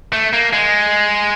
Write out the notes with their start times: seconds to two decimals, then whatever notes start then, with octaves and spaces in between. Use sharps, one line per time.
0.13 A3
0.33 A#3
0.53 G#3